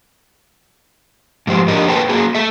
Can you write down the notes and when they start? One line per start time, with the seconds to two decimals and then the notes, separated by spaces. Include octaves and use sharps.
1.47 G#2 F3 G4 C5
1.68 F2 D4 G4 A#4 D#5
1.88 A4 B4 C5 G5 A5
2.09 F#3 A#3 G#4
2.35 A3 E5